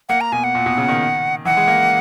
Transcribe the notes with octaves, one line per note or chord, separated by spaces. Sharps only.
A#3 F#5
A#5
B2 G#5
F#5
A#2
B2
C#3
D#3
E3 F#5
G#3
A#3